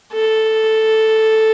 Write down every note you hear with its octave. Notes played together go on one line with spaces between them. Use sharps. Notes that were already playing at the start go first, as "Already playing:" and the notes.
A4